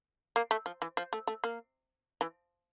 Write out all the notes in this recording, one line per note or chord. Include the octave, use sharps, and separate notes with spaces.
A#3
A3
F3
E3
F3
A3
A3
A#3
E3